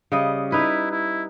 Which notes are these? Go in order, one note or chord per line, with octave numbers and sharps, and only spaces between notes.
C#3 G3 D#5
D#4 E4 B4
E4